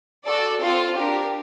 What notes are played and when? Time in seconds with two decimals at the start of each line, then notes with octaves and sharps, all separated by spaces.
0.24 F#4 A4 D5
0.59 C4 F4 A4 C5 F5
0.94 D4 G4 A#4